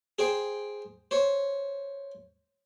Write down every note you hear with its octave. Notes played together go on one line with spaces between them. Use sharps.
G#4 C5 G5
C5 C#5